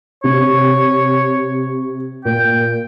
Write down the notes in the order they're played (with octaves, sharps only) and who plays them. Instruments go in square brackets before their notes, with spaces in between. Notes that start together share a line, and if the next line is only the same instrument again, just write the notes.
[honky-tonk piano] C3 [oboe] C#5
[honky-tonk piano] A#2 [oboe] G5